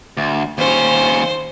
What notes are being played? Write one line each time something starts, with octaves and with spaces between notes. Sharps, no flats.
D2
D#2 C#4 C5